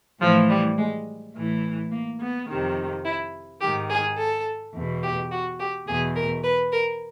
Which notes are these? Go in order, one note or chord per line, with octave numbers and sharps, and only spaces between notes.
A2 E3 F3
G3
G#3
A2 E3
A#3
B3
F2 C3 D#3
E4
G#2 D#3 G4
G#4
A4
E2 B2
G4
F#4
G4
E2 B2 G#4
A#4
B4
A#4